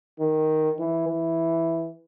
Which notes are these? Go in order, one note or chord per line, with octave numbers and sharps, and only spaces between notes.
D#3
E3
E3